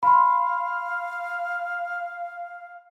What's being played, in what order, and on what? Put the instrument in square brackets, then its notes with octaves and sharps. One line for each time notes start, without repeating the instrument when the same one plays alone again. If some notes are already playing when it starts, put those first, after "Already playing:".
[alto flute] F5 [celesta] B5 C6